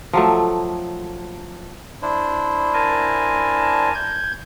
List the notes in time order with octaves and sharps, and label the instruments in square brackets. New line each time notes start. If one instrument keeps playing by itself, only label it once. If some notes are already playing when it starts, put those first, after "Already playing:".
[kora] F3 F#3 A3
[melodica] D4 E4 C5
[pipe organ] A#4 G#5 A5
G6 G#6